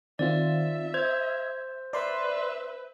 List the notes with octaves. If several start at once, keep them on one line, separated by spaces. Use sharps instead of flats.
D#3 C4 F4 D5 E5
C5 G#6
B4 D5 E5 C6